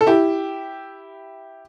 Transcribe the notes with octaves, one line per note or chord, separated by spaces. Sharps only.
A4
E4 G4